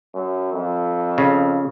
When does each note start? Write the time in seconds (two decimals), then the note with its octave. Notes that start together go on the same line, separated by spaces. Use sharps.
0.14 F#2
0.53 F2
1.18 C#3